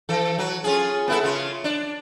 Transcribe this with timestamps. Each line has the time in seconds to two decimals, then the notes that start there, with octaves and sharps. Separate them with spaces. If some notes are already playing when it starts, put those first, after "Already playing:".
0.09 E3 A4
0.39 F#3
0.64 C#4 F4 G#4
1.08 B3 E4 A4
1.23 C#3 F4
1.64 D4